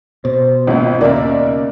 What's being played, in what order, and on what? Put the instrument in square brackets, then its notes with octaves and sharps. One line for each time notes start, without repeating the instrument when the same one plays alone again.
[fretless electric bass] B2 [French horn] C5
[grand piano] G#1 B3 [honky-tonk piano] C#2 A#2 [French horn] D#5
[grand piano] D#2 A#4 E5 [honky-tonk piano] C#3 A#3 D5